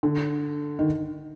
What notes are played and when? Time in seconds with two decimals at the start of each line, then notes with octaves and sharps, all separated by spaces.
0.03 D3
0.79 D#3